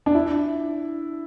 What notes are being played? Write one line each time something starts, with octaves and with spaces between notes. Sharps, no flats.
D4
E4